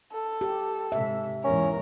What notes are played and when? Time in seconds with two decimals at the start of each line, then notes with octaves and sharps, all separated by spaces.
0.11 A4
0.41 G4
0.92 G#2 C3 E5
1.44 E2 G#2 C#4 A#4